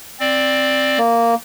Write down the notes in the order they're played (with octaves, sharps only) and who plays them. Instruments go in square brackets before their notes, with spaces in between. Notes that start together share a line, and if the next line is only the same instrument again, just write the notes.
[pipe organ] C4 D5
[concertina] A#3